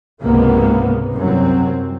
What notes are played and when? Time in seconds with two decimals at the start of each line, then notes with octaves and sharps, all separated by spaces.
0.21 C#2 G#2 C3 A#3 B3
1.14 C2 F#2 C3 F#3 C4